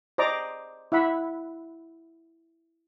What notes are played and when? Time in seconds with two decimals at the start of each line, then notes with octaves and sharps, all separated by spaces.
0.18 C5 D5 D#5 A#5 D6
0.92 E4 E5 F#5 B5